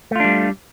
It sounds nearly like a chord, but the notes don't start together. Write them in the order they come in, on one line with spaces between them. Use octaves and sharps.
A3 F4 D4 G3